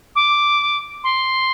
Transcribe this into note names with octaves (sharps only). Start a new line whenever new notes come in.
D6
C6